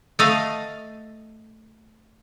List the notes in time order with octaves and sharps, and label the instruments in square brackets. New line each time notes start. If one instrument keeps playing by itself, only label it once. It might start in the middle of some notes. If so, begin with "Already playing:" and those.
[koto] A3 D#5 F5